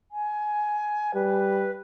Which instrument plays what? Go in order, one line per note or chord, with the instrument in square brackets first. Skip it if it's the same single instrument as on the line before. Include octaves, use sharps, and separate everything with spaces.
[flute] G#5
[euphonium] G3 [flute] B4